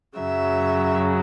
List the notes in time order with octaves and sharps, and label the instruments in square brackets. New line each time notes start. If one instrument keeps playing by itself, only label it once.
[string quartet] F#2 C#3 F#3 E5